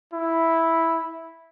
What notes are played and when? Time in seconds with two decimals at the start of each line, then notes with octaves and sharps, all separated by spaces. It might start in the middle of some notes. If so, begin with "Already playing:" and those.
0.13 E4